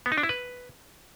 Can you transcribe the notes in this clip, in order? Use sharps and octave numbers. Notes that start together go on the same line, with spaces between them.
B3
D#4
D4
E4
B4